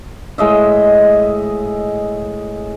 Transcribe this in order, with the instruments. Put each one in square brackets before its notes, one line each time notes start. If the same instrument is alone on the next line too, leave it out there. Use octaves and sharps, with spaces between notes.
[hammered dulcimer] A2 G#3 D#5 E5